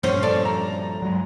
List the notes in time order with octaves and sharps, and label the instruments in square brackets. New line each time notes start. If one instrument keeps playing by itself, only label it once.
[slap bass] G2 A#2 F3 [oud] C#4 C5
[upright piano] A4 [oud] D5
[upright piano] A#5
[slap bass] F#3 G#3